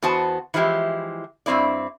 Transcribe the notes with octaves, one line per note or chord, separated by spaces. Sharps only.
E2 B3 F#4 C5 A5
E3 F3 G#3 E4 G4
G2 C3 C4 E4 D5